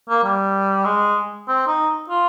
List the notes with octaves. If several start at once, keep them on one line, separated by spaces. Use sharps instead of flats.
A#3
G3
G#3
C4
D#4
F4